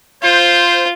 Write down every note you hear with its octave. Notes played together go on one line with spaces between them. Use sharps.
F4 C5